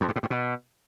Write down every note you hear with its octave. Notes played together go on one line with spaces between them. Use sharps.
F2
G2
A2
G2
B2